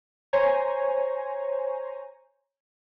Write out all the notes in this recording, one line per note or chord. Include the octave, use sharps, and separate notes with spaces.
C5 C#5 G#5 A#5